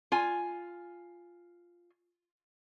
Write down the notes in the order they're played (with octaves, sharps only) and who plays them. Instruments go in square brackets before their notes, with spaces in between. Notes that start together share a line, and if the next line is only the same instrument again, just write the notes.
[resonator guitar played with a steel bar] F4 G#5